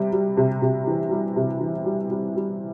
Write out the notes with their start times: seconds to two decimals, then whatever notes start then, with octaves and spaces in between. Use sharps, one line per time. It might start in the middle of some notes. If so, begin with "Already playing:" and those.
Already playing: C3 G3
0.12 G3
0.37 C3
0.62 C3
0.87 E3
1.11 G3
1.36 C3
1.60 E3
1.86 G3
2.10 G3
2.36 G3